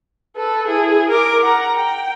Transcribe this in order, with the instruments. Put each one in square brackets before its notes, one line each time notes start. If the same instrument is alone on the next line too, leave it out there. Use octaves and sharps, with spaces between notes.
[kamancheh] A4 B4
E4 G#4
A#4 D6
F#5 A#5
G5